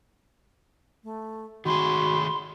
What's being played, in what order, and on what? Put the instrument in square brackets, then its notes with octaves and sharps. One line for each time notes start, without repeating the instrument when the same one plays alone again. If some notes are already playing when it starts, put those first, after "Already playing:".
[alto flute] A3
[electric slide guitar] D#3 A3 G#4 [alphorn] F#4 [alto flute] B5 [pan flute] C6